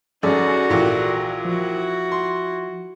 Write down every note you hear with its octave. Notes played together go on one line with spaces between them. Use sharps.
F#2 C#4 D#4 F#4 G#4 A4 D5
A#1 A#2 E3
F3 E4 F#4
C6